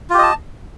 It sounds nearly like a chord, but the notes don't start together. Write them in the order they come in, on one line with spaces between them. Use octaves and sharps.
F4 G4 D#5 A5